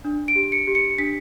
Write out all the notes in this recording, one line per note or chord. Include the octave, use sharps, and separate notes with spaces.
D4
D7
G4
C#7
G4
C#7
D4 B6